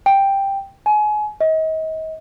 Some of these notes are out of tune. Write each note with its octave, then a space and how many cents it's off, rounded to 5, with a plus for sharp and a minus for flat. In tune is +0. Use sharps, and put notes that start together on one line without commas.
G5 +5
G#5 +30
D#5 +35